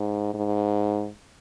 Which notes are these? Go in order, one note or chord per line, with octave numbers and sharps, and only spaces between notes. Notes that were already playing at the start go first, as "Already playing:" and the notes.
Already playing: G#2
G#2